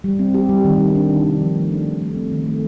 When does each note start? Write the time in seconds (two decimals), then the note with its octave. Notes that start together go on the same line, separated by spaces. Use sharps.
0.04 G3
0.19 C4
0.34 G4
0.49 G3
0.65 D#3
0.80 G3
0.95 D4
1.10 D#3
1.26 C3
1.41 F3
1.56 A3
1.71 D4
1.87 D#3
2.02 A3
2.16 C4
2.32 D#3
2.46 A3